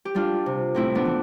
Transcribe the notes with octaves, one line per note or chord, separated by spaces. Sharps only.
G4
G3 D4 F4
C3
A2 C4 E4
B3 D4
E3